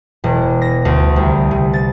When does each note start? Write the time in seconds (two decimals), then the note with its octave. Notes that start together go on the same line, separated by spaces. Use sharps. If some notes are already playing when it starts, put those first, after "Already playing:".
0.24 E1
0.62 A#6
0.85 D2
1.16 C2
1.51 C3
1.73 A6